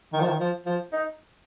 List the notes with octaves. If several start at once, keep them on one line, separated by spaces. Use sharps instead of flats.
D#3
F3
D#3
F3
F3
D#4